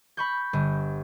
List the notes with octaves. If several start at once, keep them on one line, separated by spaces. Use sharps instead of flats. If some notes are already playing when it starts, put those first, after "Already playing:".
B5 C#6 G6
G1